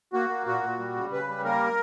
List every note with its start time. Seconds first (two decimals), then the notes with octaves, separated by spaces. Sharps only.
0.13 A#3 F#4
0.29 A#3
0.46 A#2 F#4
0.63 A#2
0.79 G3
0.95 C#3
1.11 C#3 B4
1.28 G3
1.44 A#3 A#4